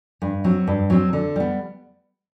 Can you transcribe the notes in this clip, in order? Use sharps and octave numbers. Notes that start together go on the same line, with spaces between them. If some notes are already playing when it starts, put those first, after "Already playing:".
G2
F#3 C4
G2
F#3 C4
D3
G3 B3